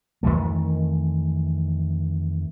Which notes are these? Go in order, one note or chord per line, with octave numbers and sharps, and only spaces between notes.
F2 D#3 E3 A3